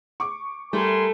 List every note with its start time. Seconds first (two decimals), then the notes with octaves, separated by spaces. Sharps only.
0.20 C#6 D6
0.73 G3 A3 A#4 G#5 C6